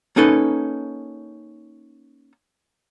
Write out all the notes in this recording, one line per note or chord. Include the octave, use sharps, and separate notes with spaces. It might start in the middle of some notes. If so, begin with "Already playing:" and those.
A#3 C#4 D#4 A4 B4